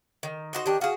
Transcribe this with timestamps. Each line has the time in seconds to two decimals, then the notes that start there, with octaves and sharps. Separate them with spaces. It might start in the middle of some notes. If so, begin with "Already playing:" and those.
0.23 D#3
0.53 D#4 F#4 C5
0.66 D#3 D4 G4
0.81 F#4 G#4 F5